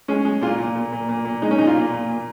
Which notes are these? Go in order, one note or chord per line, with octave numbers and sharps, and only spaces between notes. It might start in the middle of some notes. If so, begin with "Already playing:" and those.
G#3 C#4
G#3
A#2 F4
A#2
A#2
A#2
A#2
A#2
G#3 D#4
C#4
A#2 D#4
F4
A#2
A#2
A#2